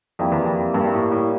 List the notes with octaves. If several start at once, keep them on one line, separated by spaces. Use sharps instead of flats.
F2 G3 A#3 E4 G4
E2
F2
G2 G3 A#3 E4 G4
A2
A2